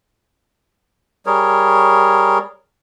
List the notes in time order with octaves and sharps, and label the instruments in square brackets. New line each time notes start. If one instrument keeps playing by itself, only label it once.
[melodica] G3 G#4 A#4 C#5